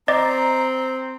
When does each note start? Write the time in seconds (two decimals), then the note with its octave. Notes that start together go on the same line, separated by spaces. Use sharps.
0.08 C4 D5 D#5 A#5 D6